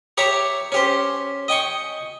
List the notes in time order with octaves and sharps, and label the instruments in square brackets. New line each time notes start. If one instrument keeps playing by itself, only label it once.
[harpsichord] G4 C#5 E5 A#5 D6
C#4 G4 C5
D#5 G5 G#5 C#6